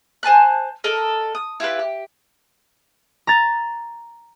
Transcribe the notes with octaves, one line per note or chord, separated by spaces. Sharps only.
C5 G#5 A5 F#6
A4 A#4 D#5
D#6
E4 F4 G4 B4
G4
A#5 A6